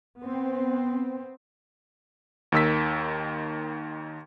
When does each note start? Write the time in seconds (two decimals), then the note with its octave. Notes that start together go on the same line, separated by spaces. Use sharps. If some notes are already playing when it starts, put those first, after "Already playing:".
0.19 B3 C4
2.52 D#2 D#3 E6 B6